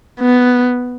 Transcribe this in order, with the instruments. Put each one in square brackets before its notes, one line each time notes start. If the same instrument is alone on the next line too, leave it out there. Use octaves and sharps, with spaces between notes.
[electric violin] B3